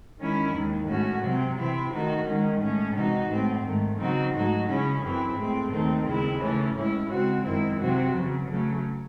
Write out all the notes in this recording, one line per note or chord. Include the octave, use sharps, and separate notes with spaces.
D#3 G#3 C#4 E4
D#2 D#3 G#3
A2 G#3 C#4 F#4
C3 F#3 C4
C3 E3 C4 E4
D#3 A3 D#4 F#4
D#3 G#3 C#4
A2 G#3 C#4
C3 E3 G#3 D#4 F#4
A2 G#3 C4
G#2 D#3 A3
C#3 F#3 C4 D#4 F#4
G#2 F#3 A3 D#4 F#4
C#3 G#3 C#4 E4
F#2 E3 C4 E4
A2 G#3 C4
D#2 D#3 A3 C4
D#2 C#3 G#3 C4 E4
C#3 E3 A3 C#4
A2 G#3 C#4 E4
C#3 G#3 C4 F#4
F#2 D#3 G#3 C4 E4
C3 F#3 C4 F#4
E2 C#3 F#3
C#3 F#3 A3